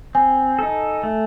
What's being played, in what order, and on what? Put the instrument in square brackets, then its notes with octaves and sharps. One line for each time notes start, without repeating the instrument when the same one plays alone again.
[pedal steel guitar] C4 [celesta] G#5
[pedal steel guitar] D#4 A4
A3